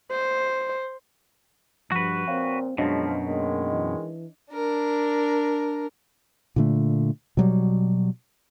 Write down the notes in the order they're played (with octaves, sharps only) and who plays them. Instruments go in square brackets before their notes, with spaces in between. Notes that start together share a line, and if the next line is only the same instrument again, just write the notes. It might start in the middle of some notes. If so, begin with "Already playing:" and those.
[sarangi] C5
[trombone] G2 [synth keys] F3 [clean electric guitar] F#4 B4
[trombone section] A#2 [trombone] C4 [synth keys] C#5 F5 G5
[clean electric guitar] F#2 B2 [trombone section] F3 [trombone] G#3 [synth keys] D4 C#5 D#5
[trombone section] D#3 G#3 [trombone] A#3
[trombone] E3
[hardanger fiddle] D4 A#4
[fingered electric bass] A#2 D3 A3
B2 F#3 G3